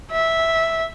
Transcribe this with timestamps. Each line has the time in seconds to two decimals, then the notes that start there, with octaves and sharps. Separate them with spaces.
0.11 E5